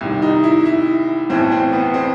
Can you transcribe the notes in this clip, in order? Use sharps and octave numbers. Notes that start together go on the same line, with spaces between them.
C2 C3 D#3
D#4
E4
E4
B1 A2 E3 C4
C4
B3
C4